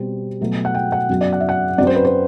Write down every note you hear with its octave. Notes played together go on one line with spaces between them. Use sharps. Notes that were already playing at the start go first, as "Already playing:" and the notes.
Already playing: B2 G3 C4
B2 F#3 A3
F#5
G5
F#5
F#2 F#3 B3
D5
F#5
E5
F#5
F#2 F#3 C4 D5
C5
B4
C5